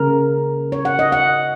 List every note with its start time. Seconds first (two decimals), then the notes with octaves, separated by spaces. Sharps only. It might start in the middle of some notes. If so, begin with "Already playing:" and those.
Already playing: C#3 A#3 A#4
0.72 C#5
0.85 F#5
0.99 D#5
1.12 F#5